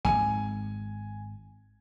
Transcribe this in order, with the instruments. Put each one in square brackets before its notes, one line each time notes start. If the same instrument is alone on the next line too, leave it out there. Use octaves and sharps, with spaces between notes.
[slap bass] D#1 G#1 [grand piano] G#5